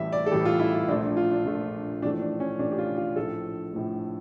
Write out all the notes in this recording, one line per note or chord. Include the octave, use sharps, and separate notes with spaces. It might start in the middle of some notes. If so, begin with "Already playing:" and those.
Already playing: A1 A2 E3 G3 E5
D5
A4
A1 A2 E3 G3 G4
F4
E4
F4
A#1 A#2 F3 A3 D4
D4
F4
D4
A#1 A#2 F3 A3
A1 A2 F3 A3 D4
D4
C#4
A1 A2 F3 A3 D4
G4
F4
F4
A#1 A2 F3 A3 A4
A#1 A2 F3 A3